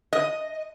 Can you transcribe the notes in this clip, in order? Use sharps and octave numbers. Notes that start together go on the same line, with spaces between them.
D#5